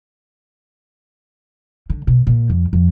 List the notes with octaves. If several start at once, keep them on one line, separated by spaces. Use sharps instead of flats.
D3
B2
A#2
F2
F2